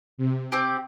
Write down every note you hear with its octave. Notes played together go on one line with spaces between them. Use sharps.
C3
C4 G4 D5